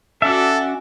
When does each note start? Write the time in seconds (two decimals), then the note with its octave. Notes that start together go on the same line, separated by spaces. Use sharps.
0.22 C#4 F#4 A4 D5 E5 F#5